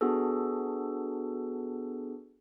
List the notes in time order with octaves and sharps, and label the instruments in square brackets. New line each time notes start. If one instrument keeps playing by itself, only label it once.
[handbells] B3 D4 F#4 G#4 A4